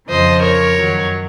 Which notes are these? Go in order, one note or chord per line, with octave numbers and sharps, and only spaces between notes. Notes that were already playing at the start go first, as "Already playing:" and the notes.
F2 C#3 F3 C5 D#5
A#4 C#5
F#2 D#3 F#3